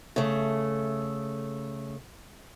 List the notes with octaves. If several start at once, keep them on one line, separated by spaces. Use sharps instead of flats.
C#3 A3